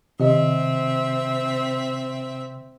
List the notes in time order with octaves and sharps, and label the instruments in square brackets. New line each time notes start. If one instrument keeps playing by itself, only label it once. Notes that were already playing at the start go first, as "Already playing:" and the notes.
[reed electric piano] C3 [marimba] D#3 D#5 [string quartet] C4 E5